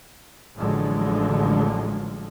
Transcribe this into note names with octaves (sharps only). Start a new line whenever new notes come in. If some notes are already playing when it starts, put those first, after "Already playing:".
A1 A2 D3 F3 F#3 G#3